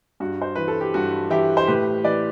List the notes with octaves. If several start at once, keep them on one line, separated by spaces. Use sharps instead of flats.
G2 F#4
C5
E3 B4
A4
G4
G2 F#4
E3 E4 G4
C5
A2 G4 B4
E3 B4 D5